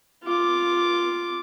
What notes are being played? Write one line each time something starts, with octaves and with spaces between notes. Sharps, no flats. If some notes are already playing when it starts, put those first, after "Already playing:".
F4 D6